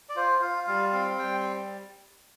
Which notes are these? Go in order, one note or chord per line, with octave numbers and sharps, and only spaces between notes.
D5
F4 C5
F4 F5
G3 F5
C4 F5
G3 G5